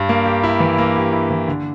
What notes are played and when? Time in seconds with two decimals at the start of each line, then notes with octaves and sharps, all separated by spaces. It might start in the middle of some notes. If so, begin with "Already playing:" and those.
Already playing: G2
0.09 A#3
0.26 G4
0.43 E4
0.60 E3
0.78 A#3
0.96 G4
1.13 E4
1.31 E3
1.47 D3